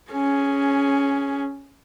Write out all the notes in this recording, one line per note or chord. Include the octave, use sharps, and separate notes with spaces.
C#4 G#4